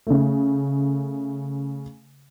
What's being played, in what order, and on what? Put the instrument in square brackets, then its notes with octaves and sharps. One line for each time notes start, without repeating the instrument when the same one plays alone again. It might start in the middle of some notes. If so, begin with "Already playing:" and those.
[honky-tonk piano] C#3 A3